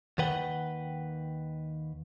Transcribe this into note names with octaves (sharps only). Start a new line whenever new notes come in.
D#2 D#3 B4 F#5 G5